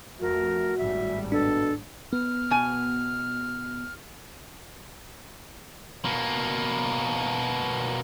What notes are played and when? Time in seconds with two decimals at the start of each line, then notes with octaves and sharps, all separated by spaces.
0.21 F2 A3 F#4 A#4
0.78 G#1 A2 G3 E5
1.32 B2 D4 A4
2.13 B3 F6
2.50 B2 G#5
6.05 B2 A#3